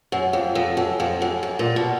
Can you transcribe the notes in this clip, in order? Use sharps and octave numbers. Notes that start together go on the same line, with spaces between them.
F#2
F2
F2
F#2
F2
F#2
F#2
A#2
B2